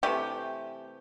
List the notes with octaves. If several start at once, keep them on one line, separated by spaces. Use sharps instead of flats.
C3 E3 G3 A3 G4